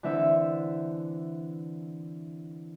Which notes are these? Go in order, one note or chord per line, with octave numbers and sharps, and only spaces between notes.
D3 E3 C4 E5 E6